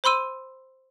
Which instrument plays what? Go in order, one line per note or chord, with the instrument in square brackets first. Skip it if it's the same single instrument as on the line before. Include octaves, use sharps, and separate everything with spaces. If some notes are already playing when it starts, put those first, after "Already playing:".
[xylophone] C5 B5 C6 E6 D#7